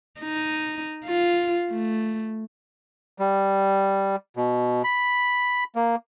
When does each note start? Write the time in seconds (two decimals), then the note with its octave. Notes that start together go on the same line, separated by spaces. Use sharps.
0.20 D#4
1.05 F4
1.71 A3
3.18 G3
4.37 B2
4.84 B5
5.75 A#3